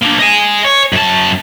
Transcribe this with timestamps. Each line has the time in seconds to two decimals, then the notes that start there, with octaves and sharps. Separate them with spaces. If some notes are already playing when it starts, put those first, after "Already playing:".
0.02 A#3 D4
0.19 D#5 G#5
0.65 C#5
0.93 F#2 A5